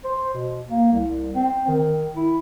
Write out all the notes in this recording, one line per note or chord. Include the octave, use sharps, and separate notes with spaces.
C5
B2
A#3
C2
C4
D#3
E4